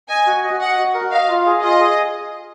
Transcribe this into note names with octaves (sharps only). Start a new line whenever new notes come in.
D#5 G#5
F#4
D#5
D#5 F#5
F#4
A#4
D#5 F5
F4
G#4
F4 D#5
G#4